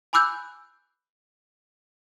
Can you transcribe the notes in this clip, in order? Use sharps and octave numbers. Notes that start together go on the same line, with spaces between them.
G#5 B5 D6 E6 F#6 G6